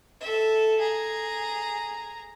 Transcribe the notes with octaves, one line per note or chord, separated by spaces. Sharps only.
A4 E5
G#4 A#5